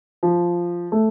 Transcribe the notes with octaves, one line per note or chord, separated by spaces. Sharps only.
F3
A3